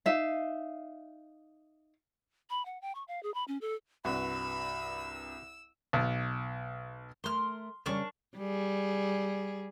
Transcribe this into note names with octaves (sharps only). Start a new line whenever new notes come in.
D#4 E5 F5
B5
F#5
G5
C#6
F5
G#4
B5
C#4
A4
C2 G2 F#4 B4 B5 E6
B1
A3 A#4 C6 F6
C#3 G3 C#4 D4 A#4 C#6
G3 G#4